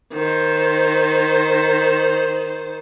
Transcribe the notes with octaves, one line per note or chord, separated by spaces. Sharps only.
D#3 C5